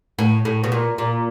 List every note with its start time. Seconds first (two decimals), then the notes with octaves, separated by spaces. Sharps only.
0.19 A2
0.45 A2
0.64 B2
0.72 A#2
0.98 A#2